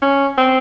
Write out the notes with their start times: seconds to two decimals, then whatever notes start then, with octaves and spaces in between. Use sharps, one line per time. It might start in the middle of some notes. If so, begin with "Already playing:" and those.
0.02 C#4
0.38 C4